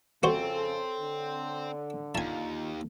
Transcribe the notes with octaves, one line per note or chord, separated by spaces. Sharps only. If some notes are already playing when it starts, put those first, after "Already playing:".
F2 C#3 C4 F#4 A4 C5 C#5
D3
D#2 F4 G#5 A5